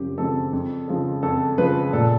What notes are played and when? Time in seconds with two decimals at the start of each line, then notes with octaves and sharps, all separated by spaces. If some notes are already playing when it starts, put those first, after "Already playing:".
Already playing: F#2 C#3 F3 C4 G4
0.18 C#3 F3 G#3 C4 A4
0.53 F2
0.88 C#3 F3 G#3
1.23 F2 A4
1.58 C#3 F3 G#3 B4
1.93 A#2 A4